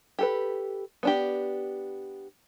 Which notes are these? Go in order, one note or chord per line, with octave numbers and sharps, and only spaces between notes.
G4 A4 B4
B3 D4 G4